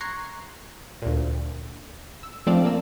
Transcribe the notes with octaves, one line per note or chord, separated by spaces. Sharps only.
A#5 C6 C#6 F#6 G#6 C7
D2 A#2
E6
F3 A3 C4 D4 D5 F5
A#3 E6